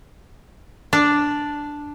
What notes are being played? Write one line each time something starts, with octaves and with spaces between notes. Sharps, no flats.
D4